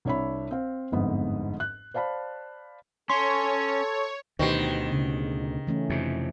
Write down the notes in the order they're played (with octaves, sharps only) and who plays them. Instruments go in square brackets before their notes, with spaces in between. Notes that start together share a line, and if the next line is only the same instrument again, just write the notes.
[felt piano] C2 D4 C#5 E5 B5
C4 F5
G1 F2 G#2 B3
F#6
C5 D5 F5 A5 B5
[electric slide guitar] C#4 [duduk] A4 [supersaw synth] C#5 [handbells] C6
[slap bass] D2 B2 [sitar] D#3 [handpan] G4 B4 C5
[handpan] C#3
E3 A3 C#4
[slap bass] F2 C3